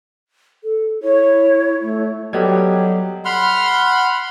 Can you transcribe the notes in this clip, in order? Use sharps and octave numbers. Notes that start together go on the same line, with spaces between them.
A4
E4 C#5
A3
F#3 G3 B3 G4 A4 D#5 G#6
F#5 B5 C6 F6